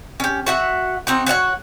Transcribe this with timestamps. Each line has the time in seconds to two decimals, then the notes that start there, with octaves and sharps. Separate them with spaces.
0.20 C#4 G4
0.46 F#4 E5 F#5
1.07 C4 D#4 F#4
1.26 F#4 C#5 E5 F#5